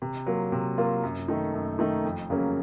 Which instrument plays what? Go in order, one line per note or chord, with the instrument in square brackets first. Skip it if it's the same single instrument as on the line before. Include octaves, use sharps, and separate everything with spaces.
[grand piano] C3
F#3 A#3 F4 A#4
C3
F#3 A#3 F4 A#4
F#2
D#3 A3 D#4
F#2
D#3 A3 D#4
F2
C#3 F#3 A#3 C#4